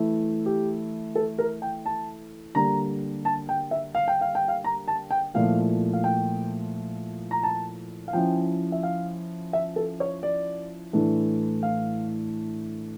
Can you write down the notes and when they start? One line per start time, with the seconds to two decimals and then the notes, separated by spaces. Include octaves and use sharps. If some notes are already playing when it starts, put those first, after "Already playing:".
Already playing: E3 A3 E4
0.46 G4
1.15 A4
1.38 A#4
1.62 G5
1.86 A5
2.55 D3 G3 A#3 D4 A#5
3.25 A5
3.49 G5
3.71 E5
3.95 F5
4.08 G5
4.21 F5
4.35 G5
4.48 F5
4.64 A#5
4.88 A5
5.11 G5
5.34 A#2 F3 A3 E4 F5
5.93 F5
6.04 G5
7.31 A#5
7.43 A5
8.08 F5
8.13 F3 C#4 E4 G5
8.72 E5
8.83 F5
9.53 E5
9.76 A4
10.00 C#5
10.23 D5
10.93 A2 E3 A3 D4
11.63 F5